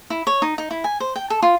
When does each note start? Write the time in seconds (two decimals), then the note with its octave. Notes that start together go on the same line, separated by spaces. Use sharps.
0.10 E4
0.27 C#5
0.42 D#4
0.58 D#4
0.71 E4
0.84 G#5
1.00 C5
1.16 G5
1.30 A4
1.42 F4